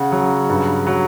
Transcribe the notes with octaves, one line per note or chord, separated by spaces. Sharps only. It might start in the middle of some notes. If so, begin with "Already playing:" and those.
Already playing: C#3 F#5
F#3
G2
F#3